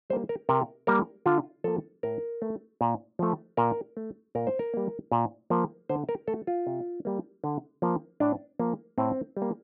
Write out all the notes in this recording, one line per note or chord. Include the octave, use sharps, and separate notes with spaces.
G3 A#3 C5
A#4
C3 A#4
G3 A#3 A#4
D3 F4
F3 A#3 A4
A2 A#4
A3
A#2
F3 A3
A#2 A#4
A3
A#2 A#4
C5
A#4
G3 A#3
A#2
F3 A#3
D3 C5
A#4
A3 A4
F4
C3
G3 A#3
D3
F3 A#3
A2 D4
F3 A#3
A2 C4
G3
A#3